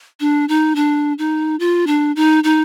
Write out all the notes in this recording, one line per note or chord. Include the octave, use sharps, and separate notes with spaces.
D4
D#4
D4
D#4
F4
D4
D#4
D#4